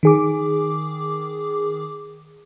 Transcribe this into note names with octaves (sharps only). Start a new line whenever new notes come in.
D#3 G#4 D6